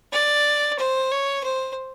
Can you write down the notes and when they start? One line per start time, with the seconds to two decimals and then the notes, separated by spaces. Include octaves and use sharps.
0.13 D5
0.79 C5
1.12 C#5
1.44 C5